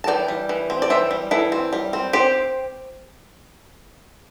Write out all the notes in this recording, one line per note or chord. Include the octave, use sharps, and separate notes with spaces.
A5
E3 D5 G5
G3
E3
C4
D5
E3 C5 E5
G3
E3 E4 A4
C4
G3
C4
C4 G4 C5